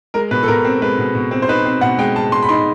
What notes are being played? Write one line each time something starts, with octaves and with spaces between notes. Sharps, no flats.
G#3 A#4
B2 B4
A4
B2 A#4
C4
G#3 B4
B2
B2
C4
C5
D#4 B4
C4
B2 F#5
G#3 G5
G#3 A5
G#3 C6
B5
D#4 C6